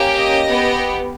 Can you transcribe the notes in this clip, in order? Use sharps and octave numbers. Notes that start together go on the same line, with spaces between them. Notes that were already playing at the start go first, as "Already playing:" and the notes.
Already playing: A#3 C#4 G4
D#5
B3 G4